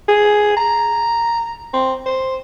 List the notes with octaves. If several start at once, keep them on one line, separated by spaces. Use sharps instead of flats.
G#4
A#5
C4
C5